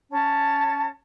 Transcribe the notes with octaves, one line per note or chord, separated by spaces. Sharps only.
C#4 A5